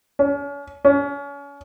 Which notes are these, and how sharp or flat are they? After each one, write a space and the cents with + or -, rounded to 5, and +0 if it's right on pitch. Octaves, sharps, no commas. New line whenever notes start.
C#4 +40
C#4 +35